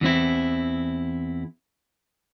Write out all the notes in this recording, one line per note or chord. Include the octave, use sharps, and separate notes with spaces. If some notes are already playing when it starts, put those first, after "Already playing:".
E2 E3 C4 E4